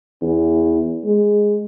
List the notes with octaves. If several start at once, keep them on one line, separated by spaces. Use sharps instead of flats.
E2
G#3